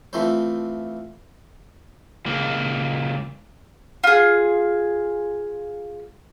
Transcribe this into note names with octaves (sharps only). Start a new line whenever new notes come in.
E3 F3 A3 C4 C5
C#2 A#3
F4 G#4